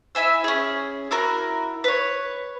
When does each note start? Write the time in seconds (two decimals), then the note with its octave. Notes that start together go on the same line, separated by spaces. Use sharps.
0.15 E4 E5 G#5 E6
0.44 C#4 G#4
1.11 E4 F#4 A#4
1.84 B4 C#5